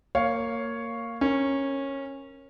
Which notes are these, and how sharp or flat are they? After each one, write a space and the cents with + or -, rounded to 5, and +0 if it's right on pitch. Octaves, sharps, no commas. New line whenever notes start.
A#3 -15 C#5 +0 F5 +0
C#4 -15 A#4 +0